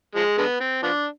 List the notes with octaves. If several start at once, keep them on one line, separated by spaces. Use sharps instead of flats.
F3 G#3
D3 G#3 B3
C4
F3 B3 D4